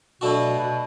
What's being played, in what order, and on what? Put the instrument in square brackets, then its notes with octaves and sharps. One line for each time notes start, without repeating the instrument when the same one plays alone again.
[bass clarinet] B2 [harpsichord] F#3 A3 D4 F#4
[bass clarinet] B2